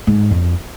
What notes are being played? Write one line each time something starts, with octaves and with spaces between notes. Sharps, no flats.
G#2
F2